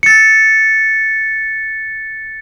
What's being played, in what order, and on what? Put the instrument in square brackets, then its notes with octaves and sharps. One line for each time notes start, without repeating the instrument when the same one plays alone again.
[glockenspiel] A6 C#7